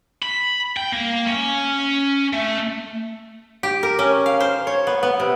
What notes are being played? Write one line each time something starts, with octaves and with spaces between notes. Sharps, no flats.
B5
G5
A#3
C#4
A3
G4
A#4
C#4
F5
C5
C#5
B3
B3
C3